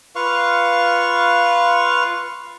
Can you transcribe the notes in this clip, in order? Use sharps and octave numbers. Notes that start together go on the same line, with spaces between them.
F4 B4 F5 C#6